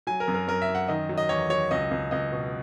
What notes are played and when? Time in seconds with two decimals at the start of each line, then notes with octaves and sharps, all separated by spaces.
0.07 F#3 G#5
0.20 A#4
0.28 F#2
0.34 A#4
0.47 F#2 A#4
0.62 E5
0.69 F#2
0.75 F#5
0.88 D#3 D#5
1.09 F#3
1.18 D#5
1.29 E2 C#5
1.50 F#3 C#5
1.71 C#2 D#5
1.91 C#2
2.11 C#2 D#5
2.32 B2